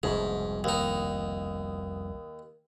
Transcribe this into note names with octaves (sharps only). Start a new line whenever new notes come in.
F1 C2 G#2 B2
D#2 D#4